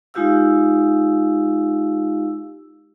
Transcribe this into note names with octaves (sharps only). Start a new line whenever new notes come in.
G#3 D#4 F4 G4 F5 E6